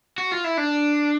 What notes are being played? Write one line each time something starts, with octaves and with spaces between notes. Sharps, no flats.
F#4
F4
E4
D4